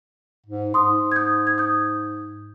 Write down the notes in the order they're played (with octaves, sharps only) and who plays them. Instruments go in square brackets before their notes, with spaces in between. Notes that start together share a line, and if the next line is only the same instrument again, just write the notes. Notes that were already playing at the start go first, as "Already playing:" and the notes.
[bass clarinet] G#2
[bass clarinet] G#2 [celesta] C6 D#6
[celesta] G#6
D#6 G6
G#6
D#6 G6